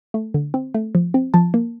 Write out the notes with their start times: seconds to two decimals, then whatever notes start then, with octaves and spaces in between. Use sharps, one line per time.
0.14 A3
0.34 D3
0.54 C4
0.75 A3
0.95 F3
1.14 C4
1.34 F3 A5
1.54 A#3